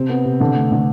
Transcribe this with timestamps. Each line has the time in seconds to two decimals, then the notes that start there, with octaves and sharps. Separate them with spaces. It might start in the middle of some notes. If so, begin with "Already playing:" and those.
Already playing: C3 C4
0.09 B3
0.25 C3
0.40 D3 D4
0.55 A3
0.72 D3